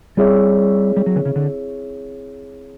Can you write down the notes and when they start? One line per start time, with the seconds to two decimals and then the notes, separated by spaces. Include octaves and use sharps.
0.17 G3 C4 E4 G#4 C#5 E5
0.97 G3
1.06 F#3
1.16 D3
1.25 C#3
1.36 D3